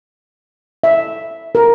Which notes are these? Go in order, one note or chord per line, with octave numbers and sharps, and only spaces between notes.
E5
A#4